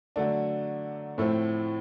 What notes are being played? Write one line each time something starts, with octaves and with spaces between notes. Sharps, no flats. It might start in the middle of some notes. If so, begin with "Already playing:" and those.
D3 F#3 A3 D4
A2 F3 A3 C4